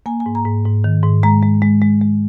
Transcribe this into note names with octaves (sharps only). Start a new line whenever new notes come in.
A#3 G#5
G#5
G#2
A#5
G#2
G#2
D#3
G#2
G#3 A#5
G#3
G#3
G#3
G#3